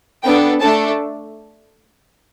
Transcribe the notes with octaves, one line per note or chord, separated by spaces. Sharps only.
B3 D4 A4 G5
A3 D4 A4 A5